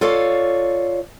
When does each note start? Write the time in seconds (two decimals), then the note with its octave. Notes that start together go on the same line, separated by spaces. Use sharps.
0.01 F4 A4 C#5 D5 F5